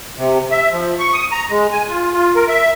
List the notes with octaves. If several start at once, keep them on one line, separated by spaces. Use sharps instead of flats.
C3
E5
F3
C#6
D#6
A#5
G#3
G#5
F4
F4
A#4
E5